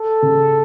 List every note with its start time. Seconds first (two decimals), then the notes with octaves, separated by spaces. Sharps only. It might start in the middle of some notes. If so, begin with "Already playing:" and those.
Already playing: A4
0.22 C#3